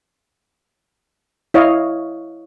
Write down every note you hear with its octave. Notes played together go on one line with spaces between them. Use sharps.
E4 C#5 D#5 F5